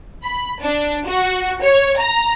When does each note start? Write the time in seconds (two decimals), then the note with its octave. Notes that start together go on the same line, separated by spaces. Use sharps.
0.24 B5
0.61 D4
1.06 F#4
1.62 C#5
1.97 A#5